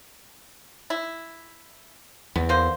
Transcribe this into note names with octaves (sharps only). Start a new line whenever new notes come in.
E4
E2 B3
D3 A#3 C5